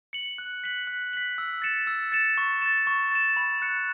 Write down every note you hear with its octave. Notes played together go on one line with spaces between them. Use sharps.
C#7 F#7
F#6
B6 F#7
F#6
B6 F#7
E6
A6 C#7 E7
E6
A6 C#7 E7
C#6
A6 E7
C#6
A6 E7
B5
F#6 C#7